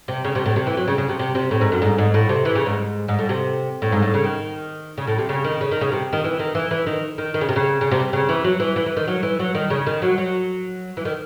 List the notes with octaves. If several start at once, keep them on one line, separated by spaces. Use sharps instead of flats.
C3
C#3
C3
A2
C3
E3
F#3
C#3
C#3
C3
C3
C3
A2
G#2
F#2
G#2
G#2
A2
C3
E3
C#3
G#2
G#2
A2
C3
A2
G#2
A2
C#3
D#3
C#3
A2
C3
C#3
D#3
C#3
D#3
C#3
C3
D#3
E3
D#3
E3
E3
D#3
D#3
D#3
C#3
C3
C#3
C#3
C3
C#3
E3
F#3
E3
E3
E3
D#3
F#3
E3
F#3
D#3
C#3
D#3
F#3
F#3
E3
D#3